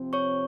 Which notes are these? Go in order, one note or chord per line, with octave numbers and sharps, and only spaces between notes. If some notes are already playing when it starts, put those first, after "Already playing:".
Already playing: C3 F3 C4
C#5 C#6